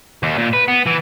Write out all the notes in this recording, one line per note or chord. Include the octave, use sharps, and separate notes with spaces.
D#2
A#2
B4
B3
E3